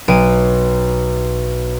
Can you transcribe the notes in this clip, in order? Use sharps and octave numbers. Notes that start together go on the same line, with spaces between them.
B1 D7 D#7